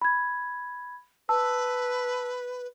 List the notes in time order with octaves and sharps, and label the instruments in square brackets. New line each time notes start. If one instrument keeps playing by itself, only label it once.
[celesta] B5 G#6
[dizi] B4 [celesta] A5 E6